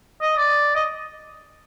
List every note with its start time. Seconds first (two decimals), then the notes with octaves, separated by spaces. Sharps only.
0.22 D#5
0.37 D5
0.76 D#5